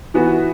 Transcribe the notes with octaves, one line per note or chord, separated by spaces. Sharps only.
E3 B3 F#4